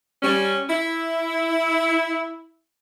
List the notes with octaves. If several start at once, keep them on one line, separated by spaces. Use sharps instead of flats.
G3 C#4
E4